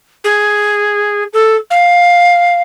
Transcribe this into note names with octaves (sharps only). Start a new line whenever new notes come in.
G#4
A4
F5